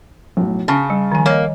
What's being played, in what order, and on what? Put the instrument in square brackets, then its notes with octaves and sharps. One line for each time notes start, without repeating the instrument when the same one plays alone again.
[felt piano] B1 A2
[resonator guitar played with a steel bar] C#3 [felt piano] A5 C#6
[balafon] G3
D#3 F3 G#5
[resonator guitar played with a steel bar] A#3 [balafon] C#5 D#5